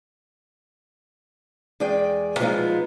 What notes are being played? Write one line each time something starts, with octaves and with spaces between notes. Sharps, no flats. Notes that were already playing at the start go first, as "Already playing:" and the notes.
E2 G#3 G#4 D5 G5
F3 F#3 G#3 B3 D#4 F4